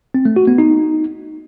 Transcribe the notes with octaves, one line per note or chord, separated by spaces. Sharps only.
C4
A3
F#4
B3
D#4